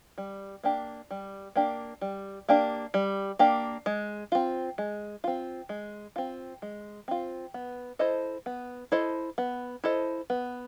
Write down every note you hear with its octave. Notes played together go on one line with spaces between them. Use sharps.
G3
A#3 D4 G4
G3
A#3 D4 G4
G3
A#3 D4 G4
G3
A#3 D4 G4
G#3
C4 F4
G#3
C4 F4
G#3
C4 F4
G#3
C4 F4
B3
E4 A4 C5 D#5
B3
E4 A4 C5 D#5
B3
E4 A4 C5 D#5
B3